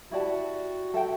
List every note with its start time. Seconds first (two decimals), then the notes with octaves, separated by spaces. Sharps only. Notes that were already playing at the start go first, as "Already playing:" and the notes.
0.11 E4 F#4 G4 D5 A5
0.94 A4 E5 G5